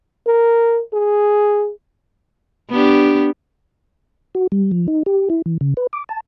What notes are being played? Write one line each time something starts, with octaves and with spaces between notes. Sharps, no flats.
A#4
G#4
B3 D4 G4
F#4
G3
F3
D#4
G4
E4
E3
C#3
B4
D6
A5